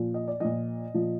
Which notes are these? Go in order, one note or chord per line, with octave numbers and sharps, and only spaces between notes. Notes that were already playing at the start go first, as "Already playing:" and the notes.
Already playing: A#2 F3
D#5
D5
A#2 F3 D#5
A#2 F3